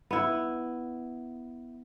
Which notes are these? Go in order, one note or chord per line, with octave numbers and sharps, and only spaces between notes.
B3 E4